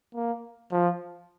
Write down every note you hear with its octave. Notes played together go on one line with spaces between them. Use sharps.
A#3
F3